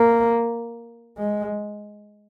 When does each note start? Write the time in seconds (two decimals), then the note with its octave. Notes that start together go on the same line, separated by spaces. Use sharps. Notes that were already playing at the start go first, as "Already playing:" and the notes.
Already playing: A#3
1.18 G#3